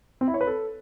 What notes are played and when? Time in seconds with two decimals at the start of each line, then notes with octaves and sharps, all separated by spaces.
0.21 C4
0.28 E4
0.34 C#5
0.41 B4
0.47 A4